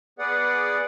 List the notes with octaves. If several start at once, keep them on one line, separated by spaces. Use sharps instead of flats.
B3 G#4 B4 D5 F#5